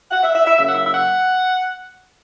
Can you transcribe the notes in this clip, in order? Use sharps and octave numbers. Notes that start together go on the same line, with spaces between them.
F#5
E5
E5
E5
C#3 F#3 A#3 E5
F#5
E5
E5
F#5